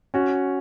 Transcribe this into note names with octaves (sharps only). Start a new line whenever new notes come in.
C#4 F#4